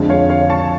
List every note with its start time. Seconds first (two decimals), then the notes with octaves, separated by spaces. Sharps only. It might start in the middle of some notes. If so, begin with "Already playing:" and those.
Already playing: F2 D3 G#3
0.09 C#5 F5
0.29 C#5 F5
0.50 A5 C#6